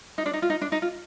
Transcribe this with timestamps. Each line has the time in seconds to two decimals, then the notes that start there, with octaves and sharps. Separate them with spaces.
0.18 D#4
0.26 D4
0.33 D#4
0.42 F4
0.50 D#4
0.61 D4
0.72 D#4
0.82 F4